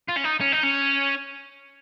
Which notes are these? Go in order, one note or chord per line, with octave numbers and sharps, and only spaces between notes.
F4
C#4
D#4
C#4
D#4
C#4